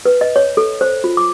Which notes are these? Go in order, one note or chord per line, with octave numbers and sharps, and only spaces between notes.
B4
D#5
C#5
A4
C5
F4
D6